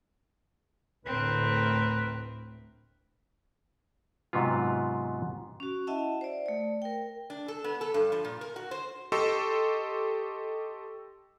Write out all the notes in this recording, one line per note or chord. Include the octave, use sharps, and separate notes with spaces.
D2 A2 C4 A#4 B4
G#2 C3 F#3 B3 F4
C#4 F#4
E4 D#5 E5 F#5 A5
C5 D5
A3 D5
A#4 G5
D4
A4
B3
A4
G2
F3
A#2
A#4
F#4
C5
G4 A4 D#5 C6 C#6 E6